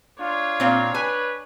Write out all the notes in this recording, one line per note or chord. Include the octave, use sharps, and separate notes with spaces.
D4 F4 C#5
A#2 C4 F5
B4 G#5